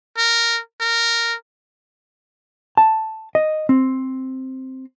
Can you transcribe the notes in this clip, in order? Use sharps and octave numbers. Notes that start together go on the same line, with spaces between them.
A#4
A#4
A5
D#5
C4